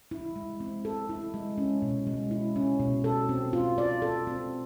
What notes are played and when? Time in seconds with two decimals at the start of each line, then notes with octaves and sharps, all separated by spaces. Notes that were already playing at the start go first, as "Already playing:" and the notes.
0.11 E4
0.36 G#3
0.60 C4
0.85 A4
1.09 E4
1.34 G#3
1.58 C#4
1.82 B2
2.07 G#3
2.31 E4
2.56 C#4
2.80 B2
3.04 A4
3.29 C4
3.53 F4
3.78 D5
4.02 A4
4.27 C4